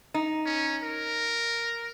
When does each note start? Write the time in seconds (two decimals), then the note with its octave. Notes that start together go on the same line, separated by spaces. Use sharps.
0.14 D#4
0.46 C#4
0.83 A#4